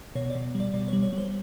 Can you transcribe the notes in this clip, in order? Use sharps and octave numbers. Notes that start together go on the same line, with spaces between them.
B2 C#5
D5
B2
G3
D5
B2 D5
C#5
G3
C#5
G3
C5